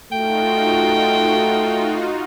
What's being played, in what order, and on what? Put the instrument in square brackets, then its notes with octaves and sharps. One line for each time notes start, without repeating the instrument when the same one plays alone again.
[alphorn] A3 [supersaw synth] D#4 F4 F#4 [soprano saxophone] G5